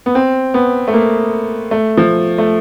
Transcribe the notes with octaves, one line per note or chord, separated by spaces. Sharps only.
B3
C4
B3
A3
A#3
A3
F3
A3